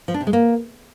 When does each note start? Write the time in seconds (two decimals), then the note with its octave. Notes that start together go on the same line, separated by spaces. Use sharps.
0.08 F3
0.14 D4
0.21 C3
0.27 G#3
0.33 A#3